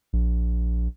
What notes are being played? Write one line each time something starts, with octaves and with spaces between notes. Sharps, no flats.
A#1